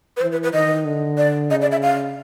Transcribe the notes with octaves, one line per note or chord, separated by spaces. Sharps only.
B4
E3 C5
B4
B4
D#3 D#5
D3
D5
C#3 D#5
D5
E5
F5